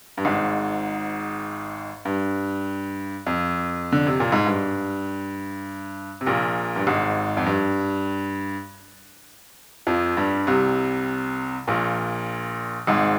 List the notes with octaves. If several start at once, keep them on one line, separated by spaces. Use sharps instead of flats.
G2
G#1 G#2
G2
F2
D3
C3
A#2
G#2
G2
C3
A#1 A#2
G2
G#1 G#2
F2
G2
F2 F3
G2 G3
C2 C3
A#1 A#2
G#1 G#2